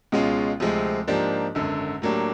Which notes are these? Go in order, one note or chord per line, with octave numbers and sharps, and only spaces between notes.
C#2 B2 G#3 C#4 F4
D2 C3 F3 G#3 C4
G#2 F3 A#3 D4 G4
G#1 F#2 D3
A2 F#3 A#3 D4 G4